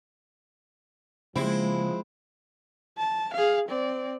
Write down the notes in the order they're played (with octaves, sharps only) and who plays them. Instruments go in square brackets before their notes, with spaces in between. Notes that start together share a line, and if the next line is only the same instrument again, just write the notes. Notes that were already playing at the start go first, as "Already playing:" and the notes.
[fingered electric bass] C#3 A#3 [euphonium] F3 [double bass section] G#3 [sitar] C4 E4
[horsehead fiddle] A5
G#4 F5
C4 D5